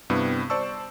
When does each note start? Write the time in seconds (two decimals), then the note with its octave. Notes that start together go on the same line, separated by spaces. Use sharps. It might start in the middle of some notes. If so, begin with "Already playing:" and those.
0.10 G2 C3 G3 B3 E4
0.50 C5 D5 A5 C#6 E6